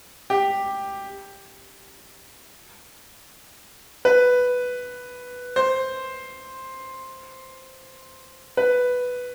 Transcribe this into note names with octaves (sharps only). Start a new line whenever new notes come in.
G4
B4
C5
B4